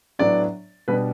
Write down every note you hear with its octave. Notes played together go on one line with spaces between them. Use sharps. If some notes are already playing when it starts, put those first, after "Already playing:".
A2 F#3 B3 D4 D5
B2 G3 B3 D4 B4